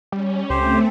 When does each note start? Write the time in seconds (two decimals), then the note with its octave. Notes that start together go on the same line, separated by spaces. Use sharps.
0.12 G3 C#4
0.50 C#2 A3 C4 G4 C5